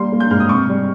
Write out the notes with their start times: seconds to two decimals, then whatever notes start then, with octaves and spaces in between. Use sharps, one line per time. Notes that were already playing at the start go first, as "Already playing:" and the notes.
Already playing: G3 A#3 C6
0.12 A#3
0.20 G6
0.30 G#2 F6
0.40 D#6
0.49 C3 C#6
0.69 G3